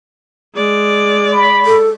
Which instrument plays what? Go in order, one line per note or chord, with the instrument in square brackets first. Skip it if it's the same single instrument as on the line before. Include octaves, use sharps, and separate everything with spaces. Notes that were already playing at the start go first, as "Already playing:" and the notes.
[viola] G#3 D5
[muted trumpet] B5
[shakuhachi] A4